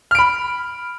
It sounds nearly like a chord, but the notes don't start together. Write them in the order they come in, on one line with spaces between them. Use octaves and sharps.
F6 D7 B5